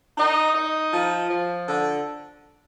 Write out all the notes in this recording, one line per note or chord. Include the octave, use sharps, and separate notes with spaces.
D#4
D#4
F3
F3
D3